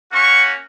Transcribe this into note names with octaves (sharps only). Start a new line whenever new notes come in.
A#3 C#4 F#4 C#6